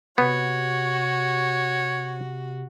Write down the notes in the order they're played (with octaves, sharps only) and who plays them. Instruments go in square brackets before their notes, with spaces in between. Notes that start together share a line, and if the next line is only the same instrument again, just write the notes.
[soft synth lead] C3 [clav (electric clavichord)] B3 [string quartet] F#4 [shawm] C#5